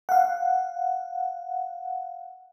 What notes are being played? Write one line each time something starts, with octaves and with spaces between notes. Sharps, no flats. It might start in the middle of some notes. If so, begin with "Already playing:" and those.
F5 F#5